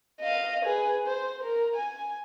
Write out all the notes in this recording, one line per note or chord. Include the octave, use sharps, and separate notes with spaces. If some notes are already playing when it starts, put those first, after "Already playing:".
D#5 F5
G#4 B4
C5
A#4
G#5